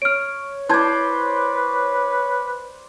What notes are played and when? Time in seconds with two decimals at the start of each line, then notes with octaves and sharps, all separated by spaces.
0.02 C#5 F6 D7
0.69 E4 B4 C5 D5 A5 G#6